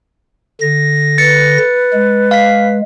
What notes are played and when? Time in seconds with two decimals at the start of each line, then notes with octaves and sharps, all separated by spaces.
0.61 D3 A#6
1.18 B4 A6 C#7
1.93 G#3
2.31 F5 B6